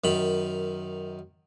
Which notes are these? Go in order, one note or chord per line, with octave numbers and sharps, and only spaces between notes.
F#2 D#3 B5